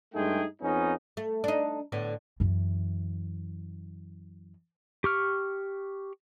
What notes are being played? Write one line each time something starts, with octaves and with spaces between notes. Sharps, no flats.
G2 G#3 A3 D#4 G#4 G5
F2 B3 C#4 D#4
A3
D4 D#4
A2 D3 B3
F#2 E3
G4 C#6 F6